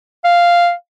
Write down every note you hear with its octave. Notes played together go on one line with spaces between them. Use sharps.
F5